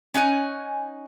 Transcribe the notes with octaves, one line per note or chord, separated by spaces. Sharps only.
C#4 D#4 F#5 G#5